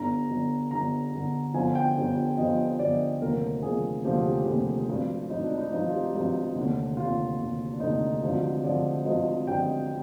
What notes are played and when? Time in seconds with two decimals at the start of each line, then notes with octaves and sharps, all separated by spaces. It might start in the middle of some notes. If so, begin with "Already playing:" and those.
Already playing: G1 G2 D3 A#5
0.29 G1 G2 D3
0.71 G1 G2 D3 A#5
1.12 G1 G2 D3
1.54 G1 G2 D3 F3 G#5
1.75 G5
1.96 G1 G2 D3 F3
2.37 G1 G2 D3 F3 D#5
2.79 G1 G2 D3 F3 D5
3.21 F1 D#2 D3 F3 A#4
3.63 F1 D#2 D3 F3 G#4
4.04 F1 D#2 D3 F3 G4
4.26 G4
4.46 F1 D#2 D3 F3
4.88 G#1 G2 F3
5.30 G#1 G2 F3 D#4
5.44 D4
5.58 D#4
5.72 G#1 G2 F3 D#4
5.86 F4
5.93 G4
6.14 G#1 G2 F3
6.55 F1 D#2 D3
6.97 F1 D#2 D3 F4
7.38 F1 D#2 D3
7.73 D4
7.80 F1 D#2 D3 D#4
8.22 G#1 G2 D3 F3
8.64 G#1 G2 D3 F3 D5
9.05 G#1 G2 D3 F3 D#5
9.47 G#1 G2 D3 F3 G5